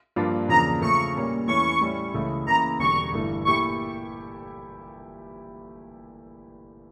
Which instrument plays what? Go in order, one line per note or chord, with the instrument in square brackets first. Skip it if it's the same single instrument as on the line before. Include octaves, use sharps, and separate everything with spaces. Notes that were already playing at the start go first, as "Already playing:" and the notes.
[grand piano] G2 F3 A#3 D4 F4
[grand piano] E2 C#3 F3 A#3 D4 [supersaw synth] A#5
[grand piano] C#3 F3 A3 [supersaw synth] C#6
[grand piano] A#2 G3 A#3 C#4
[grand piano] E2 E3 A3 C#4 [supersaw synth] C#6
[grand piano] A2 G3 C#4 E4
C#2 C#3 E3 A3 E4
[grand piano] C#3 E3 A#3 E4 [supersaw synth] A#5
[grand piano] E1 E2 D3 G3 [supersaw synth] C#6
[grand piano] G1 G2 E3 A3 E4
[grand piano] A#2 A3 E4 G4 [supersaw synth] C#6